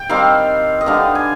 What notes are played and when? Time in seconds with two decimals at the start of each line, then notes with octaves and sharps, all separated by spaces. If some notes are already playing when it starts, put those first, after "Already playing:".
Already playing: G5
0.09 D#3 G3 C4 F5
0.81 D#5
0.86 D3 G3 B3 F5
1.15 G#5